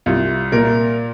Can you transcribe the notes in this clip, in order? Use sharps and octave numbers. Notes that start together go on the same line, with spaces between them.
C2 F4
A#2 A#4